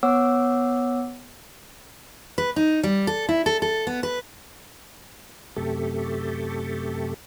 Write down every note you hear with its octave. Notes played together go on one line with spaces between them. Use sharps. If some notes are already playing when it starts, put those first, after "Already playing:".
B3 C#5 F#5 D6 E6
B4
D#4
G3
A4
E4
A4
A4
B3
B4
F#2 C3 A3 G4 A4